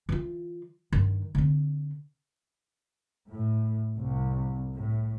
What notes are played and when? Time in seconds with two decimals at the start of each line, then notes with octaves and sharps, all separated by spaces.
0.09 E3 F4
0.92 G2 D#3
1.35 D3 C4
3.29 A2
3.97 C2
4.76 A2